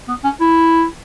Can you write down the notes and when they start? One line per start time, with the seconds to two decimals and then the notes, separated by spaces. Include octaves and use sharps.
0.08 B3
0.24 C#4
0.40 E4